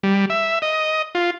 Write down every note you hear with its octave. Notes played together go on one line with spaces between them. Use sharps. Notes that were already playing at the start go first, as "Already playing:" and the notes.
G3
E5
D#5
F4